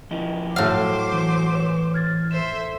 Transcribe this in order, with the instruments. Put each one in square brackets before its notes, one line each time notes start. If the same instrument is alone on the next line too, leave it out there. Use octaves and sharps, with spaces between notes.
[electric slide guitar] F3 E4 D#5
[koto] A2 F5 [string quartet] F#3 C5 D6 [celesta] F#4 F#5
[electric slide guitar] E3
[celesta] B4 C#5 E7
F6 G#6 A6
[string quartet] A4 C5 E5 [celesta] E7